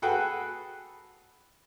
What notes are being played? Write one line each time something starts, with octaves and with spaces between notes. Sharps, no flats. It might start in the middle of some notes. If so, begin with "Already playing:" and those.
F#4 G#4 A4 B4 F#5 G5